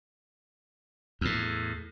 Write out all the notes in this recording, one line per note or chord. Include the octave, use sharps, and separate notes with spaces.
E2 A2